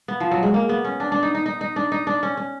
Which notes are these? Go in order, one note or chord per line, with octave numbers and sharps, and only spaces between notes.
B3
F3
F#3
G#3
A#3
B3
C#4
D4
D4
D#4
D#4
D#4
D#4
D4
D#4
D4
C#4
C#4